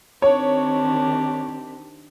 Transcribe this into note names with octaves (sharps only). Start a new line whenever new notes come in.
D#3 C4 D4 G4 C#5